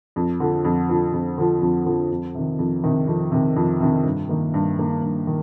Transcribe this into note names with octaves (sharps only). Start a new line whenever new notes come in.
F2
D3 F3
F2
D3 F3
F2
D3 F3
F2
D3 F3
F2
C3 D#3
F2
C3 D#3
F2
C3 D#3
F2
C3 D#3
G2
D#3 A#3
G2
D#3 A#3
G2
D#3